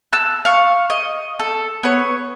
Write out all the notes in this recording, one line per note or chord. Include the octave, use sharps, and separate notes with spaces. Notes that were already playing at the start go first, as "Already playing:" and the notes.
A5 E6 F#6
F5 C#6
D#5
A4
B3 C#5